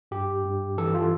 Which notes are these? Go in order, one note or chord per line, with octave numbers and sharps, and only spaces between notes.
G2 G4
G2
E3 A4
F4